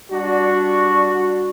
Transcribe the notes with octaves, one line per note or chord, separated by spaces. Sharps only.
G3 D4 F#4